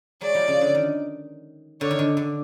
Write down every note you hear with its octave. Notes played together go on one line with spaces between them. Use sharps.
F#3 G#3 D5
F3 G3
C#3
D3
D#3
D3 C#5
D#3
D3
D3